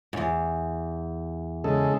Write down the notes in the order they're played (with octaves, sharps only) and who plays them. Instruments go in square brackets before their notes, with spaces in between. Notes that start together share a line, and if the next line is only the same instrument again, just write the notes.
[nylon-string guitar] E2 G#2
[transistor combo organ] C#3 G#3 A4